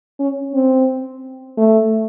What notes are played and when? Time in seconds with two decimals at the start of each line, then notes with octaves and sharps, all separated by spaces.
0.19 C#4
0.54 C4
1.57 A3